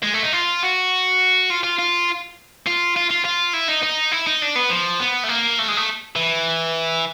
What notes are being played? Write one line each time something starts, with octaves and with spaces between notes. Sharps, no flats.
G#3
A3
D#4
F4
F#4
F4
F4
F4
F4
F4
F4
F4
E4
D#4
D#4
E4
D#4
D4
B3
F3
B3
A3
A#3
A3
G#3
A3
E3